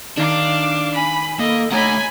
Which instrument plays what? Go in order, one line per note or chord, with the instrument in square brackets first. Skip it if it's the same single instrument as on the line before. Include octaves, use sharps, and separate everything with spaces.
[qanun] D#3 [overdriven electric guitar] D4 [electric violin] F5 D6
[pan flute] G#5 [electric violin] B5
[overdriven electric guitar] A#3 [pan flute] A4 [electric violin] D#5
[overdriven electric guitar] A3 F#5 [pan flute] C#5 [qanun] D#5 A#5 [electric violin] G#5 B5